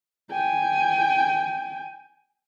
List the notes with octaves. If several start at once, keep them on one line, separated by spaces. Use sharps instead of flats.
G5 G#5